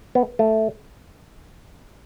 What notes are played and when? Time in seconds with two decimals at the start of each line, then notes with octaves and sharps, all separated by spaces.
0.15 B3
0.39 A3